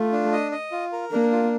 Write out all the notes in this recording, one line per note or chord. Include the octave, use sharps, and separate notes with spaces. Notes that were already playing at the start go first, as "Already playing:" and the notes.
Already playing: A3 F4
D4
D#5
D#5
F4
A#4
A#3 D4
F4